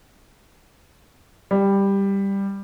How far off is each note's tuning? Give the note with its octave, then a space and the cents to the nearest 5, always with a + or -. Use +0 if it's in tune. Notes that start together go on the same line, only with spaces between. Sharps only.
G3 +10